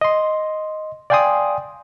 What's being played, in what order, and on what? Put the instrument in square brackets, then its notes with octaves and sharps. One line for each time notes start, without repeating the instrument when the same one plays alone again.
[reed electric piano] D#5 C6
D5 F5 G5 G#5 C6 D#6